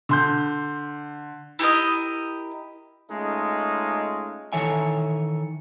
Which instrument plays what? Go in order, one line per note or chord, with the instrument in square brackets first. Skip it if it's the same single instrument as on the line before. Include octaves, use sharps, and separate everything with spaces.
[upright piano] D3 C6 G6
[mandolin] E4 G4 A#4 D#5
[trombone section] G#3 A3 C#4 D#4 F4
[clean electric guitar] D#3 E3 A4 C#5 E5 G#5